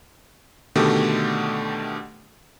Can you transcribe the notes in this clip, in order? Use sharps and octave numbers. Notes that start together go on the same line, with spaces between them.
B2 D3 D#3 A3 G4